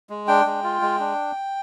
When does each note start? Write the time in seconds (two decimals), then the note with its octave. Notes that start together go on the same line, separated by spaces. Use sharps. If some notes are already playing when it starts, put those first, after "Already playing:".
0.10 G#3
0.28 D4 G5
0.46 G#3
0.64 F4
0.82 G#3
1.00 D4